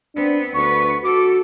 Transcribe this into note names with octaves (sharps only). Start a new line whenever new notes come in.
B3 C4 D4
D2 B3 B4 C#6
F#4 A4 D6